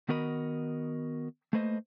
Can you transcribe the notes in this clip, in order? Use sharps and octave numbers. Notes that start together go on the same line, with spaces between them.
D#3 B3 F#4 A#4 D#5 B5
A3 A#3 B4 C5 D#5